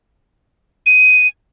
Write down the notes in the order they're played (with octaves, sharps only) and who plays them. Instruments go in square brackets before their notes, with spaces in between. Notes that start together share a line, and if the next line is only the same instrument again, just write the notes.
[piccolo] D#7